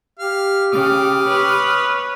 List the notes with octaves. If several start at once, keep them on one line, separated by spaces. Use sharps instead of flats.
G4 F5
C#3 D6 D#6 F6
B4 C#5